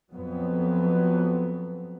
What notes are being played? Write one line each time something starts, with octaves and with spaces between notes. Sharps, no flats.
F2 F#3 B3